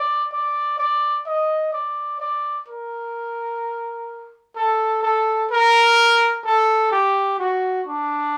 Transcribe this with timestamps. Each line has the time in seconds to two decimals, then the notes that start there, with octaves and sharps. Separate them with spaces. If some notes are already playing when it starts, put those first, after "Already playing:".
Already playing: D5
0.32 D5
0.78 D5
1.26 D#5
1.73 D5
2.20 D5
2.68 A#4
4.56 A4
5.03 A4
5.50 A#4
6.44 A4
6.92 G4
7.39 F#4
7.87 D4